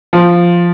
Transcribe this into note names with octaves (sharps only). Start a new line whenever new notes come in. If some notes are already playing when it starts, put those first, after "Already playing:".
F3